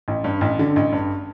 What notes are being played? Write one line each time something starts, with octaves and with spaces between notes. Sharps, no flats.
A1
G2
A1
D3
A1
G2